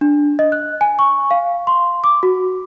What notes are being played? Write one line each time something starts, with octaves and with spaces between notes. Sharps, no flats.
D4
D#5
F#6
G#5
C#6
F5
C6
D6
F#4